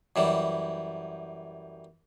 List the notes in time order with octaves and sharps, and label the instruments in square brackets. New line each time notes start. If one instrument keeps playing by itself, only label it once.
[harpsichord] F#2 E3 G3